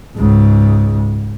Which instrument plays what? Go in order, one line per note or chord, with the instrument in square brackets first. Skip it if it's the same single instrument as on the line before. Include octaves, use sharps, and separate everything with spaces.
[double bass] C#2 G#2